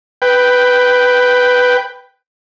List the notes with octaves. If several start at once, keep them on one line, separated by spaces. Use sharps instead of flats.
B4 G5